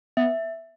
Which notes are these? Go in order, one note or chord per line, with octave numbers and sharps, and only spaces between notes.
B3 E5